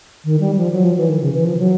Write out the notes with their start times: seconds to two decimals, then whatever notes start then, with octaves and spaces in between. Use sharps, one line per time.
0.24 D#3
0.40 G3
0.57 F3
0.73 F#3
0.84 F3
0.97 E3
1.09 D#3
1.21 C#3
1.33 E3
1.45 F3
1.58 F#3